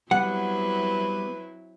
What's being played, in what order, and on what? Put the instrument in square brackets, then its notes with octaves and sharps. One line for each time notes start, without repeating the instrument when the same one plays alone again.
[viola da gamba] F#3 C4 E4 [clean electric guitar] G3 B3 [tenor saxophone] B4 [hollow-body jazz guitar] F#5